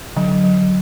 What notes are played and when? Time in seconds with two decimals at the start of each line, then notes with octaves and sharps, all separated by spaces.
0.16 D3 F#3
0.44 F#3